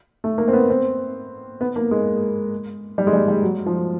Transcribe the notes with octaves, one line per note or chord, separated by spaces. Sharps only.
A3
A#3
C4
B3
C4
B3
A#3
G#3
G3
G#3
G3
G3
F#3
F3